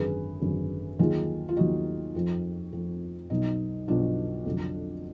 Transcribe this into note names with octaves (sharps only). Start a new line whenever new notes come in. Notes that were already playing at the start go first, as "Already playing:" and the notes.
Already playing: G#1 F#2 D3 G#4 B4
G#1 F#2 D3
D#2 D#3 F#3 F4 G#4
F4
D#2 D#3 F#3 D#4 F#4
F2 F3
F2 F3
B1 B2 F#3 D#4
B1 B2 F#3 D4 F4
F1 F2 D3 F#3